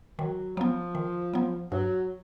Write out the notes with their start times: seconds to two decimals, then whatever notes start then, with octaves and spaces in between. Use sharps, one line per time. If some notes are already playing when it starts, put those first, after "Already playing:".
0.19 D#3 F#3
0.57 F3 F#3 B3
0.95 D#3
1.34 F#3 B3
1.72 G2 F#3